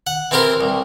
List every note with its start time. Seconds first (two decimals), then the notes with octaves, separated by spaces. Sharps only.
0.07 F#5
0.31 E3 C4 G4 A#4 C5
0.61 C2